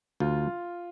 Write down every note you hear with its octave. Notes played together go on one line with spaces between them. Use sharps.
D2 F4